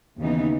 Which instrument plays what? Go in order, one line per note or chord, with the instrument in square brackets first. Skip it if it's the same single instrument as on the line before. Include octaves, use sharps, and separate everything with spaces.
[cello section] D#2 C#3 E3 B3 D#4